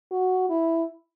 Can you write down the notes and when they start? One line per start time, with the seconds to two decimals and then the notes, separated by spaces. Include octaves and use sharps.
0.11 F#4
0.50 E4